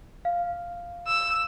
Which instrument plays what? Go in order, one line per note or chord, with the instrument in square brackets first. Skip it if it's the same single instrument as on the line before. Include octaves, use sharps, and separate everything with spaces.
[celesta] F5
[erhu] E6